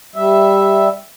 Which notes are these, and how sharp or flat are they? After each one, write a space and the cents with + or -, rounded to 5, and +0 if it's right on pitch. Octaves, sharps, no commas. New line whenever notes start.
G3 +0 E5 +0